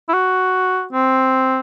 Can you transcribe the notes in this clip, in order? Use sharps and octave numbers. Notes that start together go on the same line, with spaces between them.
E4
F#4
C4